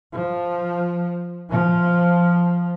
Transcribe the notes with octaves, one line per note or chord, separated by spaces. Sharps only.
F3
F3